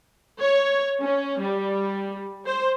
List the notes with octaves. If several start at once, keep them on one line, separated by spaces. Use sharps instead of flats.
C#5
C#4
G3
C5